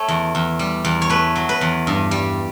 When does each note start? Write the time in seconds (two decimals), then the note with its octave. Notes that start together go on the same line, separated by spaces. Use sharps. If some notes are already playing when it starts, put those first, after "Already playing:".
Already playing: A3 C#5
0.08 E2
0.35 E2
0.59 G3
0.85 E2
1.02 C#5
1.10 A3 B4
1.36 F#3
1.49 B4
1.61 E2
1.87 G2
2.11 G3